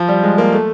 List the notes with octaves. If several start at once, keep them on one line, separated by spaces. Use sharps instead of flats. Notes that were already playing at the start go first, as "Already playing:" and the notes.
Already playing: F3
G3
G#3
A#3
A3